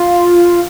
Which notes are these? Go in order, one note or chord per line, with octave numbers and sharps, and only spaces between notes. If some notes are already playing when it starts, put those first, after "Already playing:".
Already playing: F4